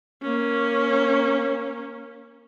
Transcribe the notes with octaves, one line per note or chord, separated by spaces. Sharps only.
A#3 C#4